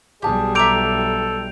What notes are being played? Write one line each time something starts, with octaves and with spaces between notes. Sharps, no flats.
B1 G3 G4 G#4 A5
A4 E5 A#5 D6 G6 D7 F7